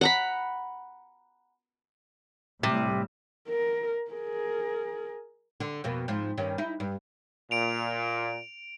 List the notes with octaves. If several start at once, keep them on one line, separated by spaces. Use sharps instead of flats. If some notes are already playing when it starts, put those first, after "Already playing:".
F#5 A#5 B5
A2 C3 G3
A#4
G#4 A#4
D3
F2 B2 A#3
G#2 F3
G2 D#3 C#4
D#4 E4
G2
A#2 D7 F7